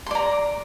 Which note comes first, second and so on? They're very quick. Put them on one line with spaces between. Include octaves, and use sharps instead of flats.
C6 D5 A#5